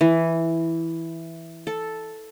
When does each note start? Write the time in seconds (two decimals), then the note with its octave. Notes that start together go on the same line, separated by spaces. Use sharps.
0.01 E3
1.67 A4